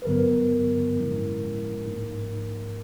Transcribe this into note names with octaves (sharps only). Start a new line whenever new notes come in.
B4
G2 D3 F#3 B3 A#4
A2 F3 G#3 C#4 E4
G#2 F3 A#3 D#4